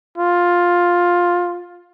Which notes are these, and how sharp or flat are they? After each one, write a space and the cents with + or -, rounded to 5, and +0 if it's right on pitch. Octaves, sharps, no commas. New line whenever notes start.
F4 +10